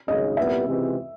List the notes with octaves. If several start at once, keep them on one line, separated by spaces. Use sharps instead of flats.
G#1 F#2 C#3 D#5
C2 A#2 G3 B3 E5
C#2 C3 E3 G#3 C4